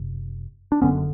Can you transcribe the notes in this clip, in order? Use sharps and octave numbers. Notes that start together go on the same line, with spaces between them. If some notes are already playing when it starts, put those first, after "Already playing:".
Already playing: F#1 C3
D4
F#1 F#2 D3 B3 C#4